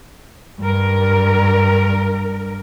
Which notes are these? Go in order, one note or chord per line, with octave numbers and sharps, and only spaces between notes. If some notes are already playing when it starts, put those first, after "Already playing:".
G2 A#4